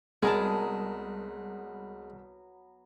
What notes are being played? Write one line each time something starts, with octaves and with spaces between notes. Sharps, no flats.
C2 F#3 G#3 B3 G#4 A#4 A5